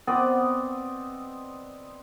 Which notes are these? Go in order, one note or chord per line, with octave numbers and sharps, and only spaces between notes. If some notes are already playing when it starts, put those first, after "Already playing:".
B3 C4 D5 D#5